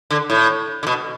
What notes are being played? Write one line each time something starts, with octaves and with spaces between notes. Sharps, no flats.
D3
A2
D3
B2